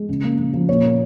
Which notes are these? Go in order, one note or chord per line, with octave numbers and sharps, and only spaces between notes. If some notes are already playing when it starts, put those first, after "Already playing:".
Already playing: G#3
C#3
A#3
C#3
F3
A#2 C#5
A#3